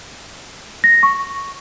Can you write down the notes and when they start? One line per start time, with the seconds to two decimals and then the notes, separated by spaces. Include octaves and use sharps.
0.84 A#6
1.03 C#6